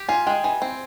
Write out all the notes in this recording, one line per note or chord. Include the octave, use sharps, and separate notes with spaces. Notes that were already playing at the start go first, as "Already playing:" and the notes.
Already playing: G4
F4 G#5
G#3 G5
E3 G#5
C4